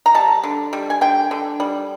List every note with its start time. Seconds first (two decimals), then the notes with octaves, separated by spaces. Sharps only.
0.06 A#5
0.15 G3 A5
0.44 D3
0.73 G3
0.90 G#5
1.01 D3 G5
1.31 D3
1.60 G3